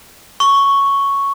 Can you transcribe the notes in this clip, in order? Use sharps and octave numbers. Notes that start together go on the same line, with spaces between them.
C#6